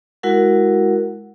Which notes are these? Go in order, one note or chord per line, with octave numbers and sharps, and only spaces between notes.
G#3 E4 F#4 A#4 F#5